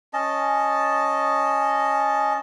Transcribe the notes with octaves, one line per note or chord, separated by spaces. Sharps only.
C#4 D#5 A5